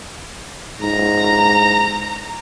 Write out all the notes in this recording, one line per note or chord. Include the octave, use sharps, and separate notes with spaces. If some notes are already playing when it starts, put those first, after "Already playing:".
G#2 A#5